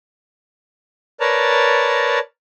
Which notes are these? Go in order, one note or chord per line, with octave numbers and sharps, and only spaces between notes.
A#4 B4 C#5 D5 A5 A#5